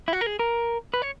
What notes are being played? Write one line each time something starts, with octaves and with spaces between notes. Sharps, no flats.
E4
F#4
A#4
G#4
A#4
B4
C#5